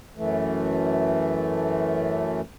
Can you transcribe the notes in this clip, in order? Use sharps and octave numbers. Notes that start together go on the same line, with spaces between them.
F#2 E3 A3